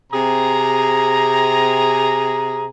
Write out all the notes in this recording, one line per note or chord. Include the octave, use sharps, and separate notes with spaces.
C3 G#4 A#5